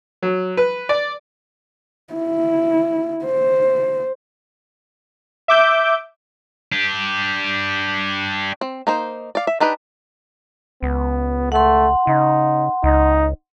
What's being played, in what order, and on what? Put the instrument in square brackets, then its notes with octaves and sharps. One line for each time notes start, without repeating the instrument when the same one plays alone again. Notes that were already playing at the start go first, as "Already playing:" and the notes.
[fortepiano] F#3
B4
D5
[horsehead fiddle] E4
C5
[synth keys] E5 D6 G6
[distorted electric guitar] D4 G4
[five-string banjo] C4
A#3 D#4 C5
D5 F5
E5
D4 D#4 G4 B4
[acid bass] C#2 [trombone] B3
[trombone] A3 [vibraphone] F#5 C6
[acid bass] C#3 [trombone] D#4
[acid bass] C#2 [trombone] D#4